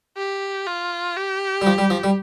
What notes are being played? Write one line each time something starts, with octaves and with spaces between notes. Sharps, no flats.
G4
F4
G4
G3
F3
G3
F3
G3